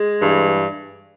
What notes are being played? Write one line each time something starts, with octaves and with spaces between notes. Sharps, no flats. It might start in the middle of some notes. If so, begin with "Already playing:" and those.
Already playing: G#3
G2 E3